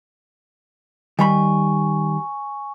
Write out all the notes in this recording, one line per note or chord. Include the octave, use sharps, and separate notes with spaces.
D#3 G3 G#5 B5 C#6